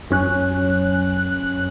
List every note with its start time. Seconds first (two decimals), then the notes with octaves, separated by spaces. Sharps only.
0.10 F#2 C#4 F#6